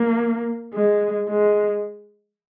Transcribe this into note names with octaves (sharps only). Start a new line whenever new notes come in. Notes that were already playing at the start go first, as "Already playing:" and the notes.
Already playing: A#3
G#3
G#3